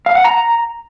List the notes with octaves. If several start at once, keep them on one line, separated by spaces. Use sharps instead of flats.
F5
F#5
A#5